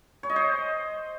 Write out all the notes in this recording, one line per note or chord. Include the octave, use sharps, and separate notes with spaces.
C#5
D#5
C5